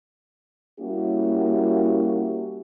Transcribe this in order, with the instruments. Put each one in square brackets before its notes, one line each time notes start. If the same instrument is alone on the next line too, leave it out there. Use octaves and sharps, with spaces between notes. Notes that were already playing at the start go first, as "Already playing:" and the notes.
[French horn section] G3 A#3 C#4 E4 F#4 G4